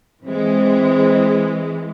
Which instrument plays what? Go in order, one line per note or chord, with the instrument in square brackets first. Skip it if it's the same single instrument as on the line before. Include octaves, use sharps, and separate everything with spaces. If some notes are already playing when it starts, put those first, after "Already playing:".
[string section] E3 G#3 [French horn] C4